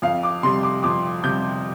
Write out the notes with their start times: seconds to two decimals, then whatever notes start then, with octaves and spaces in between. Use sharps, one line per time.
0.02 F2 F5
0.23 D6
0.43 C3 G3 C6
0.63 D6
0.83 F2 D6
1.24 C3 G3 G6